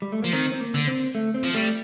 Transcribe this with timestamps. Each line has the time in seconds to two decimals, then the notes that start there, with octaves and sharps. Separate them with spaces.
0.02 G3
0.12 A3
0.22 F3 A#3
0.33 D#3 C4
0.52 C4
0.60 A#3
0.74 D3
0.87 C4
1.15 A3
1.34 C4
1.44 F3
1.54 G3 A3